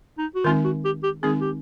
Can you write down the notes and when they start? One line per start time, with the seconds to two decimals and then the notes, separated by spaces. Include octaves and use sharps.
0.18 D#4
0.35 F#4
0.44 D#3 G#3 C4 D#4 F4
0.64 F#4
0.85 G4
1.03 G4
1.23 D#3 G#3 C4 D#4 G#4
1.41 G4